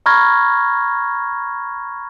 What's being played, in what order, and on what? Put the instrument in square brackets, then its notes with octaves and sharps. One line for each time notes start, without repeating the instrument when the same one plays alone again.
[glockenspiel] A#5 B5 C#6 F6 G#6 A#6